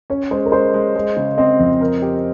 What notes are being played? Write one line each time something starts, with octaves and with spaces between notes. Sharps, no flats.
C#4 C#5
G#3 C5
A#4
G#3 C5
G#3
G#3
C#3
C4 D#5
F2
A#4
G4